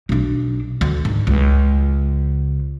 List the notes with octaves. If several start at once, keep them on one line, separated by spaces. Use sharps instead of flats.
B1 D4
D2
G#2
C#2